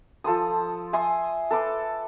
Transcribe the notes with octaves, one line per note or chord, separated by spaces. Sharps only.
F3 A4 C6 D#6
E5 G#5 C6 D#6
A4 B4 D6